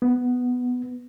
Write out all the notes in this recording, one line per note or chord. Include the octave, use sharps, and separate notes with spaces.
B3